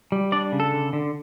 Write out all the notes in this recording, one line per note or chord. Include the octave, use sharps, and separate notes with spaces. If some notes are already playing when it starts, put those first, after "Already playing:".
G3
D4 D5
C#3
A4
D3
D3